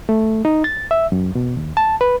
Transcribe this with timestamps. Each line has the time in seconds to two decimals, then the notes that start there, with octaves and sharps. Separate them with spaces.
0.09 A3
0.45 D#4
0.64 A6
0.91 E5
1.12 F#2
1.35 B2
1.57 D#2
1.77 A5
2.01 B4